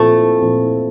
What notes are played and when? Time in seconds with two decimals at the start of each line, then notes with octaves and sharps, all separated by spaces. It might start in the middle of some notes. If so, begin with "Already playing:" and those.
Already playing: A#2 F3 A3 C4 E4
0.41 A#2 F3 C4 E4